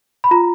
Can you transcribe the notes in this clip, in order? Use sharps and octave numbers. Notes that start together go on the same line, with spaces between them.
B5
F4 A#5